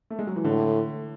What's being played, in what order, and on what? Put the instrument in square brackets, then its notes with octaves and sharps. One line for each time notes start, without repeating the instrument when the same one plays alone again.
[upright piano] A3
G#3
F#3
E3
[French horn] A2 [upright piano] D3